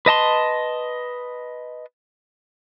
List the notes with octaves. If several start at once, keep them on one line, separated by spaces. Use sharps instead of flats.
B4 D#5 A5 C6